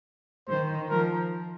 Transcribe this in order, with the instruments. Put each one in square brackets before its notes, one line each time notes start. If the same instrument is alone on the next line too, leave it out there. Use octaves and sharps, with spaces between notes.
[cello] D#3 [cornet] C5
[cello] F3 [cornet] A#4